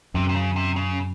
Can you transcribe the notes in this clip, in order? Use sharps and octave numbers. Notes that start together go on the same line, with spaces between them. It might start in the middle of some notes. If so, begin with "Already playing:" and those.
F#2 C3
C3
C#3
C3
C#3